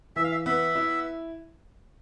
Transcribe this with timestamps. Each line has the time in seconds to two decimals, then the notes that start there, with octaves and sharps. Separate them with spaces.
0.16 E3 E5
0.24 F5
0.31 E5
0.46 B3 E5
0.75 E4